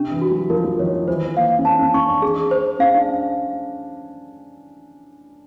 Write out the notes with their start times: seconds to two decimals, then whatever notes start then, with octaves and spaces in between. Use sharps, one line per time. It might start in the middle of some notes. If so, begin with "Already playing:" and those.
Already playing: C3 D4
0.12 E3
0.22 F#4
0.31 F#3
0.50 F3 A#4
0.64 F3
0.79 D#3 C#5
0.93 D#3
1.08 E3 C5
1.37 A#3 F5
1.59 C#4
1.65 C4 A5
1.79 C#4
1.94 C#4 C#6
2.08 D4
2.22 G#4
2.51 C5
2.79 C#4 F5
2.94 D4